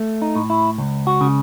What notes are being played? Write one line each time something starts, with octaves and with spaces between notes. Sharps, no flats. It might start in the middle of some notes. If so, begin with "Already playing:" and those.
Already playing: A3
D#4
A2
E4
C#2
F#4
C#3